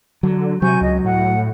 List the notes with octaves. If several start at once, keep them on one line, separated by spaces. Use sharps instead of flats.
D3 F#3
C3 F#3 G#5 C#6 G6
C#2 D#5
A2 F#5